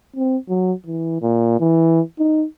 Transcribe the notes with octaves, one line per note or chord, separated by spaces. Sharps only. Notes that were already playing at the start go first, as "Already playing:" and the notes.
C4
F#3
E3
A#2
E3
D#4